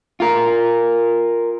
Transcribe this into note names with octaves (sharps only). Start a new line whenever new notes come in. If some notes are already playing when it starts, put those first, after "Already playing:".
F4 A#4